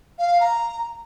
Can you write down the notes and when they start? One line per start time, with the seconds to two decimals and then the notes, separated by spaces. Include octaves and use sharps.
0.19 F5
0.41 A#5